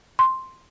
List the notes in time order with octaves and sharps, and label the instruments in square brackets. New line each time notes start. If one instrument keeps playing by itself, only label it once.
[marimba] C6